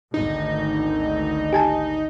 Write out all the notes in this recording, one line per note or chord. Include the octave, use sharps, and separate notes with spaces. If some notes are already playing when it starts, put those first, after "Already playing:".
G#1 D2 D#4
G4 G#5 A5